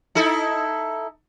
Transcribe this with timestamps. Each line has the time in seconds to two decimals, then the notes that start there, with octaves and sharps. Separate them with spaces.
0.15 D#4 E4 A4